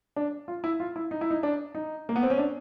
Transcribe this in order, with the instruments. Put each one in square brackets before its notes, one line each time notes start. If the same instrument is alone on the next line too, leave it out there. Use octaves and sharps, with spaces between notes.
[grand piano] D4
F4
E4
F4
E4
D#4
E4
D#4
D4
D#4
A#3
B3
C4
C#4
D4